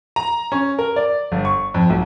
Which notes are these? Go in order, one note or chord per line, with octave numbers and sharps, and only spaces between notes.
A#5
C#4
A#4
D5
G1
C#6
F2
B1